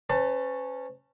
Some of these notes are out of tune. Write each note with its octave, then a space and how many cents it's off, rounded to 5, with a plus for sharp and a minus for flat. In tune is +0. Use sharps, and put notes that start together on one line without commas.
C#4 -10 B4 +45 A5 +20